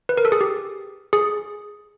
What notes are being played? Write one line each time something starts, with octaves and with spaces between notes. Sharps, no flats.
B4
A#4
A4
G#4
G4
G#4